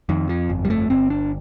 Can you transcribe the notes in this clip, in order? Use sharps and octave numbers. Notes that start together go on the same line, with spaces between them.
F2 D#3
F3
G1
G3
A3
G1 C4
D4